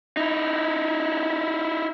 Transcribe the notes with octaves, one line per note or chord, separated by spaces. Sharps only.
D#4 E4